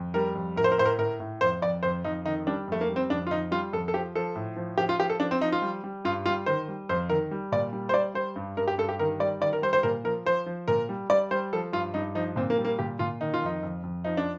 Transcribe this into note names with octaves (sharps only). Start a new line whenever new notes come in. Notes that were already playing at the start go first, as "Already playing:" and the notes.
Already playing: F2
G3 A#4
F2
A2 A#4
C5
A#4
A2 C5
A#4
A2 A#4
A2
F2 C5
F2 D5
F2 C5
F2 D#4
D#3 D#4
G3 D4
F2 A3
A#3
G3
C4
F2 D4
F4
F2 D#4
G3 F4
F2 A4
A4
F3 G4
F3 A4
A2
F3
F3 G4
F4
F3 G4
A4
F3 D4
C4
F3 D#4
F4
G3
G3
G2 F4
G3 F4
D#3 C5
G3
F2 C5
D#3 A#4
G3
A#2 D5
G3
C5
G3 D5
G3 C5
G2
G2 A#4
G4
G2 A4
G4
D#3 A#4
G3 D5
D#3 D5
A#4
G3 C5
C5
A#2 A#4
F3 A#4
F3 C5
F3
A#2 A#4
G3
G3 D5
G3 C5
F3 A4
G2 F4
G2 D#4
F3 D#4
A#2 C4
A#3
G3
A#3
A#2 G4
A#2 F4
D#3 D#4
F4
F2 D#4
F2
F2
F3 D#4
D4